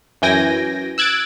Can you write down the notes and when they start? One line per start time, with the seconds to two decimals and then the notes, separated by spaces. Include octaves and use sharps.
0.22 F#2 E3 G5 G#5 A#6
0.98 E6 F#6 G#6 A6 D7